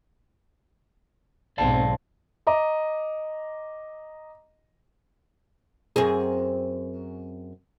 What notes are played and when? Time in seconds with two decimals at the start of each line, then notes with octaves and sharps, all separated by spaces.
1.58 B1 G#2 C4 D5 F5 A5
2.47 D#5 A#5 D6
5.96 F#2 C4 G#4